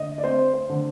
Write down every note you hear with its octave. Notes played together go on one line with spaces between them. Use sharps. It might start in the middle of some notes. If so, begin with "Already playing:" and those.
Already playing: D3 D#5
D5
C4 C5
C5
D3